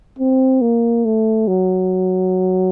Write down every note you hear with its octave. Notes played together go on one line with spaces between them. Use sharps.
C4
A#3
A3
F#3